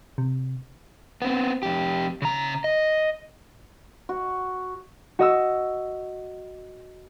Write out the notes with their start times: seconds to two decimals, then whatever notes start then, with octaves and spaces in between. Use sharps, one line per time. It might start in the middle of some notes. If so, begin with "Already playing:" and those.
0.18 C3
1.22 B3 C4
1.63 F2 G4
2.22 C#3 A#5
2.64 D#5
4.09 F#4
5.19 F#4 D#5 E6